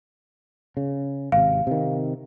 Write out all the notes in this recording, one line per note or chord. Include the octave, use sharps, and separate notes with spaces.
C#3
G#1 C3 F5
C3 D#3